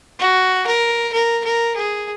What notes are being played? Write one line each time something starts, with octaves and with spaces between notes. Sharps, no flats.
F#4
A#4
A#4
A#4
G#4